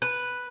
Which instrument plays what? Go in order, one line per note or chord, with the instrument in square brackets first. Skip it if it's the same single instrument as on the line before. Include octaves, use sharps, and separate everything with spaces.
[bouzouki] B4